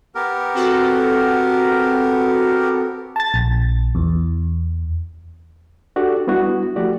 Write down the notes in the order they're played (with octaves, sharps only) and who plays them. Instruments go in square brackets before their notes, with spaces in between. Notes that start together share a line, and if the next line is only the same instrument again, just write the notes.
[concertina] B3 G4 A#4
[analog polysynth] C4 F#4 A4
[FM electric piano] A5 A6
A#1
E2
[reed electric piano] D4 F#4 G4 A4 D5
G3 B3 D4 E4 F#4
F3 A3 F#4 G4 D5